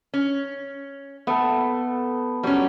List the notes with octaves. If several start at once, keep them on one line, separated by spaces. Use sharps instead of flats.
C#4
A3 B3 A4
F#3 G3 C#4